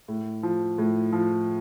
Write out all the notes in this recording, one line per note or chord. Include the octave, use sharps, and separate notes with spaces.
A2
F3
A2
F3